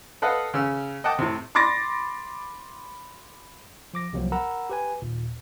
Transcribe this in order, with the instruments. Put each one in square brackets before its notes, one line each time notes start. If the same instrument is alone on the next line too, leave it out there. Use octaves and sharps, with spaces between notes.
[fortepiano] A4 B4 D#5 F5 F#5
C#3 C#4 E6
D#5 F#5 G5 A5 D6
A2 C3
[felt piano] B5 C6 D6 A6 A#6
[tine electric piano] F3 D6 A#6
C2 C3 F3 F#3 A#3
A#4 F#5 A#5 B5 E6
G4 B4 G#5
D#2 A#2